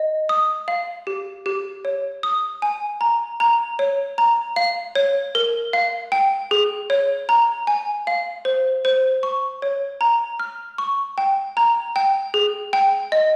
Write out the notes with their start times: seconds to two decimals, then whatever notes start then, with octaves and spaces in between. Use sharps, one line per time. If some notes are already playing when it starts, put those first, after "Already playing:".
Already playing: D#5
0.29 D#6
0.68 F5
1.07 G4
1.46 G4
1.85 C#5
2.23 D#6
2.62 G#5
3.01 A#5
3.40 A#5
3.79 C#5
4.18 A#5
4.56 F5
4.95 C#5
5.35 A#4
5.73 F5
6.12 G5
6.51 G#4
6.90 C#5
7.29 A#5
7.67 G#5
8.07 F5
8.45 C5
8.85 C5
9.23 C#6
9.62 C#5
10.01 A#5
10.40 F6
10.78 C#6
11.18 G5
11.57 A#5
11.96 G5
12.34 G#4
12.73 G5
13.12 D#5